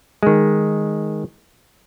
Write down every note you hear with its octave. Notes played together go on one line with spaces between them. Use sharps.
D#3 G#3